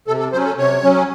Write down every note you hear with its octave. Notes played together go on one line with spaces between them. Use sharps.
C3 A4
A4
F#3 C#4 C5
A4
C3 C#5
F#3 C#4